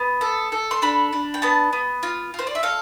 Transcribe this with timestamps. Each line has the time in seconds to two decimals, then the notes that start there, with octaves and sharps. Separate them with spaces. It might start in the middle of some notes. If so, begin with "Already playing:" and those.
Already playing: B3
0.21 A4
0.52 A4
0.71 C6
0.82 D4 B5
1.13 D4
1.34 G5
1.42 B3 A5
1.73 B3
2.03 F4
2.34 F4 C5
2.47 D5
2.55 E5
2.63 A4 F5